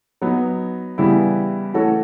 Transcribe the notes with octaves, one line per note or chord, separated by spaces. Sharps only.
F#3 B3 D#4
C#3 E3 G3 B3 E4
E3 A3 C#4 F#4 A4